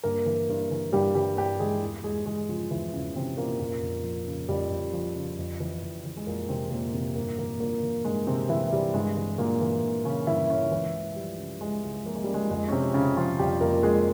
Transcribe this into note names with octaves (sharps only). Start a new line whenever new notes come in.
G2 A#3 A#4
E3
G2
E3
G2 G3 G4
E3 G3 G4
G2 G3 G4
E3 G#3 G#4
E2
E2 G#3 G#4
E3 G#3 G#4
C#3 F3 F4
E2 E3 E4
E2 C#3 C#4
C3 E3 C4
A#2 C#3 A#3
F2 A#2 A#3
F2
F3
C#3
F2 G3
F2
F3
C#3
F2
E3
F2
E3
G#3
F2 A#2 A#3
C3 E3 C4
F2 A#2 A#3
C3 E3 C4
G2 A#2 A#3
A#2 E3 A#3
G2 A#2 A#3
E3
G2 G#3
C3 E3 C4
G2 E3 E4
E3 G3
G2 G#3
E3
G2 A#2 A#3
E3
G2
C#3 E3 C#4
G2 E3 E4
C#3 E3 C#4
C#2 E3 E4
C#2
F3 G3
C#3
C#2 G#3
C#2
F3 A#3
G#3
C#3 G3
G#3
F2 G#3
C#4
F2 C3 C4
C#3 F3 C#4
C#3 F3 F4
F2 G3 G4
F2 A#3 A#4
F3 G#3 G#4